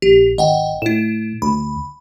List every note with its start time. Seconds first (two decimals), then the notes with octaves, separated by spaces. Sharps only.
0.02 A#1 G4
0.38 G#1 D#5 F#5 G5
0.82 A2 E4 E7
1.42 D2 B5